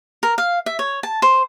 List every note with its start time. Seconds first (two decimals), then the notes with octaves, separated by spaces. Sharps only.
0.23 A#4
0.38 F5
0.66 E5
0.79 C#5
1.03 A5
1.22 C5